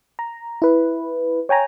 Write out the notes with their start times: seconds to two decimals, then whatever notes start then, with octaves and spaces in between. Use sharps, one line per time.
0.19 A#5
0.62 E4 B4
1.49 C#5 G5 G#5 A#5